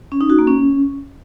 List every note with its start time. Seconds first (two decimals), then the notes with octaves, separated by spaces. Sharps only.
0.12 C#4
0.21 D#4
0.30 F#4
0.39 A#3
0.47 C#4